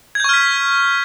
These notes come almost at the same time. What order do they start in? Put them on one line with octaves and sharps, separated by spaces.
G#6 G6 C#6 F6 B6